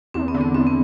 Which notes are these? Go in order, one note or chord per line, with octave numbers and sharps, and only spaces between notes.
E2 C4
B3
D3
B3
E2 C4
B3